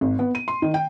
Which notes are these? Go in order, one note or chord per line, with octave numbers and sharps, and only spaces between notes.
G#1
B3
D#7
C6
D#3
G5